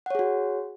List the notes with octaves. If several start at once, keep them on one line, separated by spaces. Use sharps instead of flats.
F#4 G#4 C#5 F#5